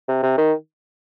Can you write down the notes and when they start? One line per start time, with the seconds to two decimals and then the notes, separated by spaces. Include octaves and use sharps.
0.08 C3
0.23 C3
0.38 D#3